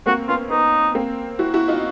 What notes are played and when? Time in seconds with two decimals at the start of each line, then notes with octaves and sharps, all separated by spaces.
0.06 A#3 C4 F#4
0.28 B3 C#4 F4
0.50 B3 D#4
0.95 A#3 C4
1.39 E4 F#4
1.54 E4 F#4
1.68 D#4 F4